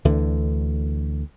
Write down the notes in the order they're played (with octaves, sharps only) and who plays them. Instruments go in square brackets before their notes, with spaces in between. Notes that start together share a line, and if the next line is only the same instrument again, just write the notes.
[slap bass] D2 D3 E3